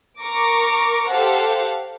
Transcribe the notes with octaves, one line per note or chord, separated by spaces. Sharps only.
A#4 A#5 C#6 D6
G4 A4 C5 F5 F#5